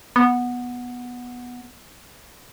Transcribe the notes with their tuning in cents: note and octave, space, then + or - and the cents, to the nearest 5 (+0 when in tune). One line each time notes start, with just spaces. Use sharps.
B3 -10